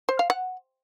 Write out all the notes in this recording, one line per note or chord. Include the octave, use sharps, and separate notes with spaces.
C5
F5
F#5